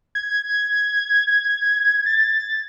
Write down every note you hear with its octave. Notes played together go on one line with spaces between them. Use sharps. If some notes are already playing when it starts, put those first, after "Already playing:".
G#6
A6